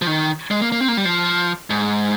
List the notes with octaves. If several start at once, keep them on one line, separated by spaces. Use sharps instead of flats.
F3
D#3
G#3
A#3
A#3
C4
A#3
G3
F3
G#2